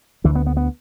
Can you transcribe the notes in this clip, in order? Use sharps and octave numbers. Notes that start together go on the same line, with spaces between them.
D2 D3 E3
B3
B3
B3